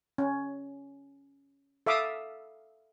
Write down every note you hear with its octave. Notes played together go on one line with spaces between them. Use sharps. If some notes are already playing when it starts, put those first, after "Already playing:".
C#4
A4 E5 F5 D6 D#6